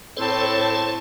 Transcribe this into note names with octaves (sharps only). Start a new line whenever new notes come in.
A2 C4 A4 C5 C#5 A5